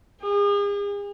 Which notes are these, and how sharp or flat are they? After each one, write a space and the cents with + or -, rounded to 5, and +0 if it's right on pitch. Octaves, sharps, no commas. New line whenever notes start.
G#4 -40